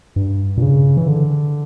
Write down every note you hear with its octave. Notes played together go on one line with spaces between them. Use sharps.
G2
A#2
C#3
E3
D3